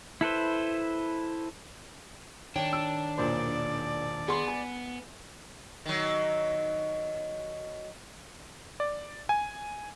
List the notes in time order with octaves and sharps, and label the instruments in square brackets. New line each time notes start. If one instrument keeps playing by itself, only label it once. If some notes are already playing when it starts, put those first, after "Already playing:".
[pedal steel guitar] E4 A4 B4 C5
[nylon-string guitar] D#3 C#5 G5 [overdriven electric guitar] D4
[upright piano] E6
[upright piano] E1 A#2 C5 [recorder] D5
[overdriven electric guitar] B3 [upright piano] G#4 C6
[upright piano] G#5
[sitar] D#3 F#3
[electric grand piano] D5
G#5